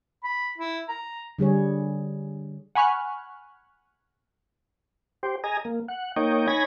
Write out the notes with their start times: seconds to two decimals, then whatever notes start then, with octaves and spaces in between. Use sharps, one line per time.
0.24 B5
0.58 E4
0.89 A#5
1.39 D3 G3 G#4 C#5
2.75 F#5 G#5 B5 C#6 F6 F#6
5.23 G4 C5
5.44 G#4 D#5 G#5 A#5
5.65 A#3
5.88 F#5
6.16 A#3 D#4 C#5 D#5 G5
6.48 D#4 C#5 G#5 B5 G#6 A#6